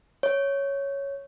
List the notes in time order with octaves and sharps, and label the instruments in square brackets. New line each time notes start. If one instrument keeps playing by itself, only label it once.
[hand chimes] C#5